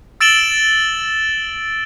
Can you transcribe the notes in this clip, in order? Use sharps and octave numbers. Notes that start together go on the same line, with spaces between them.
E6 A6 D7 E7 F#7 G7